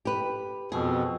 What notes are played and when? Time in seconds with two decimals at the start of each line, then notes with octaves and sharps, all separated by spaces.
0.05 G4 B4
0.72 F2 B2 G#4